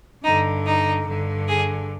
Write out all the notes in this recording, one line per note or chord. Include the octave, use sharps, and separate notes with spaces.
G2 D3 D#4
D#4
G2 D3
G#4